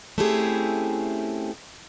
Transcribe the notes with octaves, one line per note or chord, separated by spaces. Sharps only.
A3 C4 C#4 E4 G4 G#4